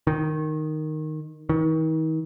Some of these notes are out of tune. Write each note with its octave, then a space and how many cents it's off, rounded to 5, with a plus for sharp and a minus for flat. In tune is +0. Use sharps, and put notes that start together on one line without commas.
D#3 -5
D#3 +40